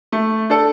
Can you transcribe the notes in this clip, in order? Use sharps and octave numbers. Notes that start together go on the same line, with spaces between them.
A3
D4 A4